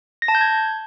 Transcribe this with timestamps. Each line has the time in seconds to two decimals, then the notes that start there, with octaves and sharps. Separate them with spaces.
0.22 A#6
0.28 A5
0.35 G6
0.41 G#6